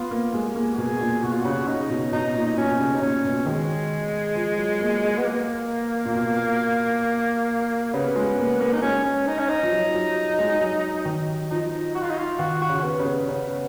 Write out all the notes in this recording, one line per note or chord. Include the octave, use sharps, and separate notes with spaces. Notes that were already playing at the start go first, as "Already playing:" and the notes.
Already playing: B3 F4
A#3
G#3 G#4
A#3
F#4
B2 G#4
A#2
B2 F#4
F4
C#3 F#4
C#3 D#4
B2
B2 D#4
A#2
D#4
B2 C#4
C#3
D#4
A#2 C#4
B2
D#3 G#3
F3
F#3
A#3
B3
A#3
A#2
B2
C#3 B3
G#3
A#3
A#3
D#4
G#3 C#4
C#4
D#4
C#4
D#4
F3
F#3
F#3
G#3
F#3
D#3
F3 D#4
F#4
F4
D#4
F4
D#3 F#4
F#4
C#3
C#4
B3
C#3
B3
C#3